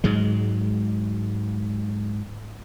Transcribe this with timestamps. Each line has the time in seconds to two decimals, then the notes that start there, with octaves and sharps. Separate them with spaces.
0.04 G#2 F#3 G#3